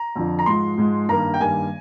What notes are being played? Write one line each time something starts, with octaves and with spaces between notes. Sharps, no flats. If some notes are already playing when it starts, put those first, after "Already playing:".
Already playing: A#5
F2 D3 F3
A#5
G#2 F3 G#3 C6
G#2 F3 G#3
G2 D#3 G3 A#3 A#5
G5
G2 D#3 G3 A#3 G#5